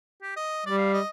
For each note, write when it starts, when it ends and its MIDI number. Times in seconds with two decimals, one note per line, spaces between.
0.22 0.35 67
0.37 0.64 75
0.66 1.00 55
0.66 0.76 74
0.78 0.90 77
0.94 1.09 75